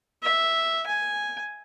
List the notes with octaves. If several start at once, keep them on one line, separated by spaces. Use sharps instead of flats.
E5
G#5